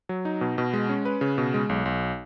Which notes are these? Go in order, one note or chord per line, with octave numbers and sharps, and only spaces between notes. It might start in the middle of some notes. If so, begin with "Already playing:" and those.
F#3
D#4
B2
B2
G#3
C#4
B4
C#3
B2
G#3
B1
B1